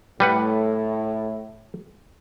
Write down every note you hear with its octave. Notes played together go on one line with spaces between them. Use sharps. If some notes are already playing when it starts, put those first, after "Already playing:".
A2 G3 B4 F#5